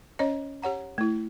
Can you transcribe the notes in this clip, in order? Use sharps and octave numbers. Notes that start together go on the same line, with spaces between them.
C#4 C5 C#5 D#5
G4 C#5 F#5 A#5
A3 E4